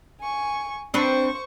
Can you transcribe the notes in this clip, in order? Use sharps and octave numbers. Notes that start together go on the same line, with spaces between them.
G#5 C#6
C4 D4 B4 C5 C#6